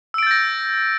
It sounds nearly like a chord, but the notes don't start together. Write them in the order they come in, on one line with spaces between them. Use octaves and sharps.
E6 D7 A6 G6 A#6